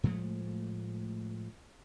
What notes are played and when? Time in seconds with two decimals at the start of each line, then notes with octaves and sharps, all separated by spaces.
0.04 A2 F3 G#3 A3